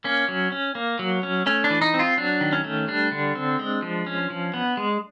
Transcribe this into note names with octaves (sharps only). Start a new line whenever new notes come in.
A#3 C#4
F#3
C#4
A#3
F#3
C#4
A3 C#4
D4
E3
D#4
C4
F4
F#3 D4
D#3
C#4
A3
G3 D4
D3
C4
G#3
F3
C#4
F3
B3
G#3